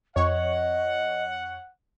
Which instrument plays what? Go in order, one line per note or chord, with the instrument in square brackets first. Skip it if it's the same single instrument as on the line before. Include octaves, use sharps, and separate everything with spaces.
[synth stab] F2 C#5 [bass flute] D#5 [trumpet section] F#5